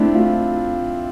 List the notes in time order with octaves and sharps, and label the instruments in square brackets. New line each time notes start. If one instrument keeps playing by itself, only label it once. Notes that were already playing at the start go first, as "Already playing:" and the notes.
Already playing: [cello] A3 [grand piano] C4 D4 E4
[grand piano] F4